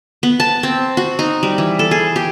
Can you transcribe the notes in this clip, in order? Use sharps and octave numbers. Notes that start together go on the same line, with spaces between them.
B3
A5
C4
F#4
D#4
G3
E3
A4
G#4
G4